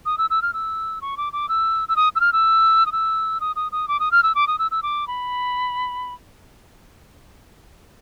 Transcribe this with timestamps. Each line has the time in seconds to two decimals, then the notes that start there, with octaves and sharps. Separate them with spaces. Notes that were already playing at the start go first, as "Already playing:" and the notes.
0.06 D#6
0.18 E6
0.30 E6
0.42 F6
0.53 E6
1.02 C#6
1.17 D6
1.33 D6
1.49 E6
1.89 E6
1.96 D#6
2.15 E6
2.20 F6
2.33 E6
2.86 D#6
2.92 E6
3.40 D#6
3.56 D#6
3.72 D#6
3.88 D6
4.00 D#6
4.12 F6
4.23 E6
4.35 D6
4.47 D#6
4.59 E6
4.71 E6
4.83 D6
5.07 B5